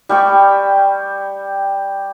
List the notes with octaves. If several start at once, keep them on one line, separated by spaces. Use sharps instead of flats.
G3 G5 C#6